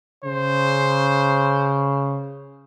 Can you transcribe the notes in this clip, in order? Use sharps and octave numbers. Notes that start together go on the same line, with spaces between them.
C#3 C5